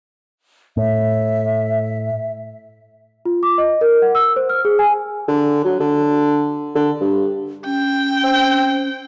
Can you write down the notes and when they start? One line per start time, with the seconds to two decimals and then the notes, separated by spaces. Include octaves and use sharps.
0.77 A2 E5
3.25 F4
3.43 D6
3.58 D#5
3.81 A#4
4.02 F#5
4.15 E6
4.36 C5
4.49 F6
4.65 G#4
4.79 G#5
5.28 D3
5.65 F#3
5.80 D3
6.75 D3
7.01 G2
7.65 C#4 G5
8.23 C4